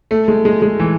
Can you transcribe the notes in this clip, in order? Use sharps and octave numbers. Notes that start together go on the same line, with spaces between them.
A3
G#3
G#3
G#3
E3